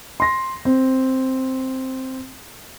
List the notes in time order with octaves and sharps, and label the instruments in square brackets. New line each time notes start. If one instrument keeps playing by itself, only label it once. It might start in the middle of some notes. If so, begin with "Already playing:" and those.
[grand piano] C6 A#6
C4